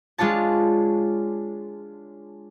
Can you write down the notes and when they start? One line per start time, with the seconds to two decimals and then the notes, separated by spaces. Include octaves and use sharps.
0.18 G#3 D4 F4 C#5 A5